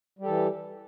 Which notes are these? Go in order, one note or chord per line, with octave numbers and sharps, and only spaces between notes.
E3 G3 G4 A4